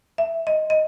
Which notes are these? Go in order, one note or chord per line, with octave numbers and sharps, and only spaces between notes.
E5
D#5
D#5